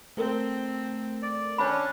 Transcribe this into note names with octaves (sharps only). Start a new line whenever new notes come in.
A3 C4 A4 A#4
D5
C#4 D4 C#5 B5